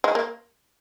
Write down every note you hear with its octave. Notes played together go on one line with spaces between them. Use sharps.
G#3
A#3